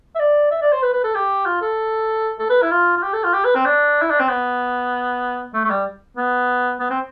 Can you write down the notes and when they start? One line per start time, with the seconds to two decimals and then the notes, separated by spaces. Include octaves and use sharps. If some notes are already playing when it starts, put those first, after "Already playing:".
0.15 E5
0.19 D5
0.51 E5
0.62 D5
0.72 C5
0.83 B4
0.93 B4
1.04 A4
1.15 G4
1.46 F4
1.62 A4
2.39 A4
2.50 B4
2.62 E4
2.71 F4
2.97 F4
3.03 G4
3.13 A4
3.24 F4
3.34 G4
3.44 B4
3.55 C4
3.65 D4
4.02 E4
4.11 D4
4.20 C4
4.29 B3
5.54 A3
5.64 A3
5.70 G3
6.17 B3
6.80 B3
6.90 C4